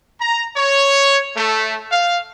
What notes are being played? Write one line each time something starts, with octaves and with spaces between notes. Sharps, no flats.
A#5
C#5
A3
F5